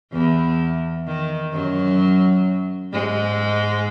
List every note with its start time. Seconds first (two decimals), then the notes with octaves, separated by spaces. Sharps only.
0.12 E2 E3
1.06 D#3
1.53 F#2 F#3
2.93 G#2 G#3